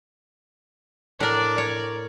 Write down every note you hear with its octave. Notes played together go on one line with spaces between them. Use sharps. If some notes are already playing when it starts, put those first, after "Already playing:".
A2 D4 A#4 D5
A#4 C#5